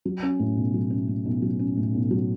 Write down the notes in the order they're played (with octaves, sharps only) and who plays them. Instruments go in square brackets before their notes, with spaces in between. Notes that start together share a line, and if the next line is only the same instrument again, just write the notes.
[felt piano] F#3
C#4
A2
B1
F#3
C#4
A2
B1
F#3
C#4
A2
B1
F#3